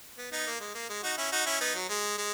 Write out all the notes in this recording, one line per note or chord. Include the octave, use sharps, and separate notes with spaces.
B3
B3 D#4
A#3
G#3
A#3
G#3
D#4 F#4
C#4 E4
D#4 F#4
C#4 E4
B3 D#4
F#3
G#3
G#3